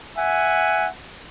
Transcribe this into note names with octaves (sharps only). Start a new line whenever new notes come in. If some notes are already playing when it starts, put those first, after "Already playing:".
E5 F#5 G#5